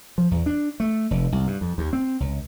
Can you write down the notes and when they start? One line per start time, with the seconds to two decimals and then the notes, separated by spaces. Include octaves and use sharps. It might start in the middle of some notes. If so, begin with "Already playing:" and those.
0.18 F3
0.31 E2
0.46 D4
0.80 A3
1.11 F1
1.32 C2
1.47 G2
1.61 F2
1.78 D#2
1.93 C4
2.20 C#2